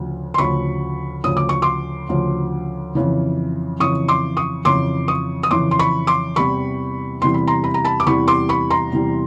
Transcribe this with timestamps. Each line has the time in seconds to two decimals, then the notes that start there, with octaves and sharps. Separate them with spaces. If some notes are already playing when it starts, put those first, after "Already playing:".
Already playing: D2 C#3 F3
0.34 C6
0.38 D2 C#3 F3 B5 C#6
1.24 D2 C#3 F3 D#6
1.37 D6
1.49 C#6
1.62 C6 D6
2.09 D2 C#3 F3
2.95 F2 C#3 E3
3.80 F2 C#3 E3 C#6 D#6
4.08 C6 D6
4.37 C#6 D#6
4.65 F2 C#3 E3 C6 D6
5.08 C#6 D#6
5.43 D#6
5.51 F2 C#3 E3 C6 D6
5.71 C6
5.79 B5 C#6
6.07 C6 D6
6.36 E2 C3 E3 G3 B5 C#6
7.21 E2 C3 E3 G3 C6
7.34 B5
7.47 A#5 C6
7.64 B5
7.74 A#5
7.84 A5 B5
8.00 D6
8.07 E2 C3 E3 G3 B5 C#6
8.28 C6 D6
8.49 B5 C#6
8.71 A#5 C6
8.92 E2 C3 E3 G3